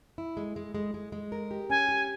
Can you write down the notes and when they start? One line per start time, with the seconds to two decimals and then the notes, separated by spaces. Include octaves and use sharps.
0.18 E4
0.37 G#3
0.56 G#3
0.74 G#3
0.94 G#3
1.12 G#3
1.32 A#4
1.51 G4
1.70 C#4 G#5
1.89 G4